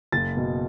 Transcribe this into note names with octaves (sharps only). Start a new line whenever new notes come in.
F#1 A6
B2